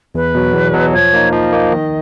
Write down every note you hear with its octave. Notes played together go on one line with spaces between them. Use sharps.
E2 B4
B2 F#3
E2
B2 F#3
F3 C#5
A#3 D#4
F3 D#5
A#3 D#4
D#3